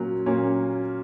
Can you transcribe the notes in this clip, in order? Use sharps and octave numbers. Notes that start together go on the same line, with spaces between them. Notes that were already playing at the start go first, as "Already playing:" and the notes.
Already playing: A#2 F#3 A#3 C#4
A#2 F#3 A#3 C#4